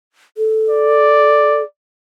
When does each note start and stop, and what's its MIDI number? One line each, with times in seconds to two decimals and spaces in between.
0.37 1.63 69
0.69 1.65 74